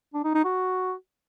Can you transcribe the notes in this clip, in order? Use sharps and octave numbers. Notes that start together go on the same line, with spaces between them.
D4
D#4
D#4
F#4